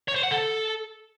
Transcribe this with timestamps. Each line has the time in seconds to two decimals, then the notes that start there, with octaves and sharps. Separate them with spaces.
0.08 C#5
0.16 C5
0.23 F#5
0.31 A4